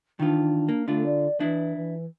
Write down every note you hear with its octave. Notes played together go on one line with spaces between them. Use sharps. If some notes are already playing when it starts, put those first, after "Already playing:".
D#3 E3 D4 F4
A#3
D3 A3 D4 F4
D5
E3 D4 E4
E3